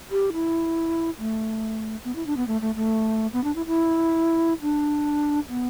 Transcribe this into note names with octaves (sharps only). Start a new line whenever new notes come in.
G4
E4
A3
B3
E4
D4
B3
A3
A3
A3
B3
D4
E4
E4
D4
B3